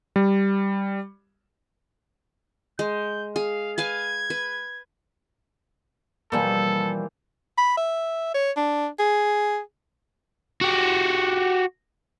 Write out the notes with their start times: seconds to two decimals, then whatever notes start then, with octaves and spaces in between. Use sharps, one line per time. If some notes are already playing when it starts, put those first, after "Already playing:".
0.16 G3
2.79 G#3 G6
3.36 G#4 F5
3.78 B4 F5 G#5 G#6
4.30 B4
6.32 B2 E3 F3 G3 A#3 A4
7.58 B5
7.77 E5
8.34 C#5
8.57 D4
8.99 G#4
10.61 F#4 G4